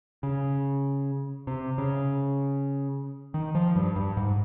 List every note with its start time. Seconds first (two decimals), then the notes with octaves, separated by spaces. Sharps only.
0.23 C#3
1.47 C3
1.78 C#3
3.34 D#3
3.55 F3
3.76 G2
3.96 G2
4.17 G#2